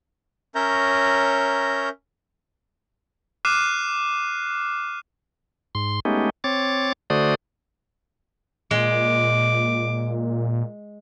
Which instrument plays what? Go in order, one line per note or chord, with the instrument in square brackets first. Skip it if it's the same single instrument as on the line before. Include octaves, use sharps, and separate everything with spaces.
[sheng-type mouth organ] C#4 A#4 C#5 E5 A#5 G6
[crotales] D6 F6 F#6 C7 D#7 E7
[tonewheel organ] G#2 C6
G#3 A3 B3 C#4 D#4 G4
C4 C#5 D6 A6
D3 A3 F#4 C5 D5 D#6
[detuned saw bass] A#2 [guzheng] G#3 [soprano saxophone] D6